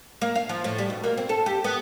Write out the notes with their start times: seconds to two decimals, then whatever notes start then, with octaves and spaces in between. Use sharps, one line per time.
0.22 A#3
0.35 F5
0.49 F3
0.64 A2
0.78 G3
0.90 B2
1.04 A#3
1.17 C4
1.29 A4
1.46 G4
1.64 B3